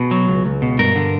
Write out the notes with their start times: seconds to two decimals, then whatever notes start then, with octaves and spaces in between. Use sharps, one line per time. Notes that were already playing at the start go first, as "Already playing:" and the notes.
Already playing: B2 G#4
0.11 F#3
0.28 C#2
0.46 C#2
0.62 B2
0.79 G2 A#4
0.96 D3